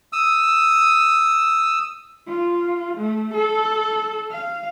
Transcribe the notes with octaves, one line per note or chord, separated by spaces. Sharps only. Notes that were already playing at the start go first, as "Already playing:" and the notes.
D#6 E6
F4
A3
A4
F5